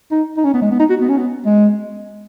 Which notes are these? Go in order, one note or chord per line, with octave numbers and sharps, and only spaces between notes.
D#4
D#4
C#4
B3
G#3
B3
D#4
F#4
B3
C#4
B3
G#3